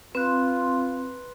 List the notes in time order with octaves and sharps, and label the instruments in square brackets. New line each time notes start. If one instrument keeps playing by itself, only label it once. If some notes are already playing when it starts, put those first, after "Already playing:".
[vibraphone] C4 [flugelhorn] F4 [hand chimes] B4 C6 F#6